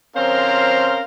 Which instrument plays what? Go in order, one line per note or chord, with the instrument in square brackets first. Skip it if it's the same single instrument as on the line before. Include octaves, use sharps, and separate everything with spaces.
[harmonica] C4 C#4 F5 [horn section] A#4 C5 C6